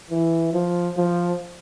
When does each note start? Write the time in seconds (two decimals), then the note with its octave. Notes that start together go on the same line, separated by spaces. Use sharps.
0.11 E3
0.53 F3
0.97 F3